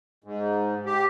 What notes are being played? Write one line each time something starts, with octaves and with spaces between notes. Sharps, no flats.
G#2
G4